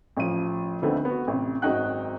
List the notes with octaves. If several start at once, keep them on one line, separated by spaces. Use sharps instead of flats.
A1 F3 D#7
D2 D3 D#3 A3 B3 C4
B3 F#4
A1 C3
G#1 F#2 D#4 F#4 G5 F#6